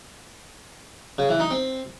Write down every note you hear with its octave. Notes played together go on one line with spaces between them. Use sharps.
C#3
E3
D#4
C4